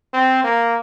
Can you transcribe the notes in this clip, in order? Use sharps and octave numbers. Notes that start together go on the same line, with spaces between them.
C4
A#3